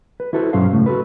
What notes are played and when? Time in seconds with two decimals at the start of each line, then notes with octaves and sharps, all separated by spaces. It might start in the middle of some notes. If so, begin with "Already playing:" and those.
0.20 B4
0.33 E4 F#4 A4 B4 C5
0.53 B1 G2 F#3 C#4 C5 F5
0.73 A2 C#3 A3
0.86 F#4 A4 B4